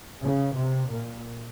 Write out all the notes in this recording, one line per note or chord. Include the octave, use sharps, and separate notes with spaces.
C#3
C3
A#2